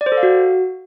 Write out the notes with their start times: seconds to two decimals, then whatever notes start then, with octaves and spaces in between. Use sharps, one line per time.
0.01 D5
0.06 C5
0.12 A4
0.17 F5
0.23 F#4